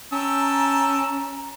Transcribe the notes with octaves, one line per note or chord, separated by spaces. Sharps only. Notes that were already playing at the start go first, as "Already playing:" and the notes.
C#4 G5 A5 A#5 E6